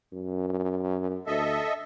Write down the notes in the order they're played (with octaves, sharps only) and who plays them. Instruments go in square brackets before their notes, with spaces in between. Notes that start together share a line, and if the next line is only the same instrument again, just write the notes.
[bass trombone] F#2
[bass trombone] D2 [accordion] A4 D#5 E5